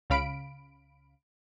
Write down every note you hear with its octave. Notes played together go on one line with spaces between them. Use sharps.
C#2 C#3 F5 B5 D7